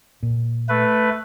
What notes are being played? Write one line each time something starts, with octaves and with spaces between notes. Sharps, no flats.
A#2
A3 B4